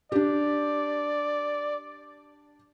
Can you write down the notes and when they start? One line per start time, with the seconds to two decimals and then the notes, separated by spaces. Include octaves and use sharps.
0.12 D4 G4 D5